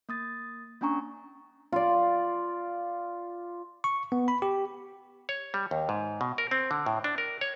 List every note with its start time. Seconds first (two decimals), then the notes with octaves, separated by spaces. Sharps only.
0.09 A#3 D#6 A6
0.81 A#3 C#4 D4 G#5 A#5 C#6
1.72 F4 D5
3.84 C#6
4.12 B3
4.28 B5
4.42 G4
5.29 C#5
5.54 G3
5.71 D#2
5.89 G#2
6.21 B2
6.38 A#4
6.51 C4
6.71 D3
6.86 A2
7.04 D4
7.18 A#4
7.41 C#5